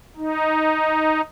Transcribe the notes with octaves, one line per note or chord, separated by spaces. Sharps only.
D#4